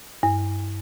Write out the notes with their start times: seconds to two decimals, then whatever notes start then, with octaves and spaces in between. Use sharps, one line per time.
0.23 G2